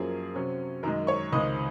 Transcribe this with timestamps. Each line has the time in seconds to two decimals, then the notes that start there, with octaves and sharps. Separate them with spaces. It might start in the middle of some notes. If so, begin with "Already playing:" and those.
Already playing: F#2 F3 A#3 C#4 G#4
0.35 C3 F#3 C#4
0.83 F#2 D#3 G#3 A#4 A#5
1.07 C#5 C#6
1.32 C#2 C3 D#3 G#3 D#5 D#6